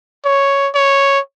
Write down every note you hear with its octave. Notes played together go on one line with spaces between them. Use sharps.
C#5
C#5